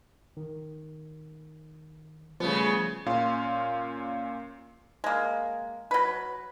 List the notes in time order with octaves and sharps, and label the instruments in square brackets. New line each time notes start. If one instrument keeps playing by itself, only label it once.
[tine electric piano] D#3
[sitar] C#3 B3 [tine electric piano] F3 G3 A3
[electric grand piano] A#2 C#4 F5 C6
[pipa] G#3 A#3
F#3 B4